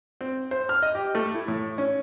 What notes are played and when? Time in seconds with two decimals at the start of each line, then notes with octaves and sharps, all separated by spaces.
0.21 C4
0.51 C5
0.69 F6
0.82 D#5
0.95 G4
1.15 A3
1.34 E4
1.48 A2
1.78 C#4